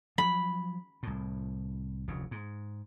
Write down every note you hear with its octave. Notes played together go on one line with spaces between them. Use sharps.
F3 F#3 B5
C2 A2
F1 D2 C#3
G#2